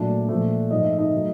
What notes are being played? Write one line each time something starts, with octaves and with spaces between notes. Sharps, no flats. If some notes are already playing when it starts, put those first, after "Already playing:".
Already playing: A#2 F#3 A3 D4 D5
A#2 F3 A3
G#2 F3 A3 D#5
E5
D#4 D#5
D#3 F#3 A3